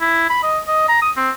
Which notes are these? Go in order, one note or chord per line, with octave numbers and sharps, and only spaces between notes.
E4
B5
D#5
D#5
A#5
D#6
C4